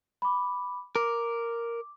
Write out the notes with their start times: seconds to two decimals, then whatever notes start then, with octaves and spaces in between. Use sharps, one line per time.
0.22 B5 D6
0.96 A#4 D6